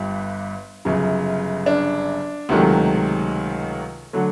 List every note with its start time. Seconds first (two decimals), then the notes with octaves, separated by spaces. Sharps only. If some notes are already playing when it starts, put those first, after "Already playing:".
Already playing: G1 G2 G3
0.85 G1 F#2 C#3
1.66 D4
2.49 C#2 C3 D#3 F#3 A3
4.13 D3 F#3 A3